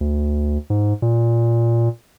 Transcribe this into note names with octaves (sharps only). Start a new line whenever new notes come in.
D2
G#2
A#2